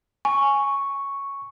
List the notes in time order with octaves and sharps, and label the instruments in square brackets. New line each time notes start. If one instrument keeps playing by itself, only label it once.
[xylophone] G#5 [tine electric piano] C#6